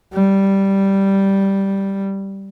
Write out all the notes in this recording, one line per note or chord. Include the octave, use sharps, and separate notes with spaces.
G3